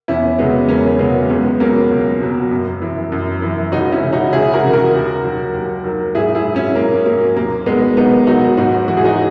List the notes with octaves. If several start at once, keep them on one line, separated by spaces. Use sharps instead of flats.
E2 C#4 E4
C#3 F#3 G#3 B3
E2 A#3 C#4
C#3 F#3 G#3 B3
C#2 G#3 B3
B2 F#3 A#3 C#4
C#2
B2 F#3
F#2
E3
F#2
E3
C#2 D#4 F#4
C#4 E4
C#3 E3
D#4 F#4
C#2 E4 G#4
F#4 A#4
C#3 E3
F#4 A#4
D#2
D#3 F#3
D#2
D#3 F#3
G#2 E4 G#4
E4 G#4
F#3
C#4 E4
G#2 A#3
F#3 A#3
D#2 A#3
D#3 F#3 G#3 B3
D#2 B3 D#4
D#3 F#3 D#4 F#4
G#2 D#4 F#4
E3 F#4
G#4
D#4 F#4